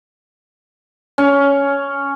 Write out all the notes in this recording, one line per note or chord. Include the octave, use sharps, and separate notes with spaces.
C#4